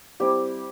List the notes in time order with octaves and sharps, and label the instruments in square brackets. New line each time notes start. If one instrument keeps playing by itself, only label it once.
[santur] G3 C4 E4 G4